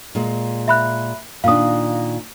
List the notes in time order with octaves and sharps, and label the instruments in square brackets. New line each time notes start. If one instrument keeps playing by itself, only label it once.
[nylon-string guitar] A#2 G#3
[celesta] E5 B5 F#6
[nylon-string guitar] A#2 D#3 D4 [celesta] F5 D#6